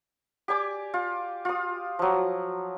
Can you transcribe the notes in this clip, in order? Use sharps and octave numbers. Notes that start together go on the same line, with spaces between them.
G4 D5 G#5 D6
F4
F4 D#6
F3 F#3